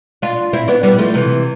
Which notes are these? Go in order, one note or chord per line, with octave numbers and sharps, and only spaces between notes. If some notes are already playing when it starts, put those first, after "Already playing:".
D4 F4
C4 E4
B3 D4
G3 B3
F3 A3
C3 E3